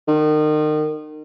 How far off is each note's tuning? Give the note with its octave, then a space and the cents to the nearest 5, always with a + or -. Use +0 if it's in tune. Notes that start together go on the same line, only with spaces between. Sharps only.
D#3 -30